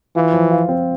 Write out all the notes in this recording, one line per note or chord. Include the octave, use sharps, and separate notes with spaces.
E3 F4
F3
F4
C4